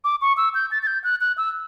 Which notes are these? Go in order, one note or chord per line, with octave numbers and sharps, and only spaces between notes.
D6
C#6
E6
G6
A6
A6
G6
F#6
F#6
E6